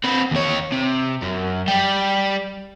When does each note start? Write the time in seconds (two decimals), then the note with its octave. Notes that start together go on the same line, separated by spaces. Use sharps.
0.04 C4 B4
0.31 D#2 C#5
0.72 C3
1.22 F#2
1.68 G3 G4